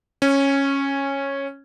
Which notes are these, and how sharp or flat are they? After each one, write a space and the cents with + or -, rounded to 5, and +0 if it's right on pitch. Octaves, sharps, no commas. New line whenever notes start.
C#4 -10